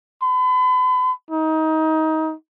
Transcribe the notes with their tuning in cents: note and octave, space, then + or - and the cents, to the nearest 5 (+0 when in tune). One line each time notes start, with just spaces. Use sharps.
B5 +40
D#4 +25